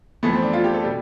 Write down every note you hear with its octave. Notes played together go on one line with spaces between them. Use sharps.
F2 E3 A3 B3
C4
D4
F4
G4
A4
B2 G3 G4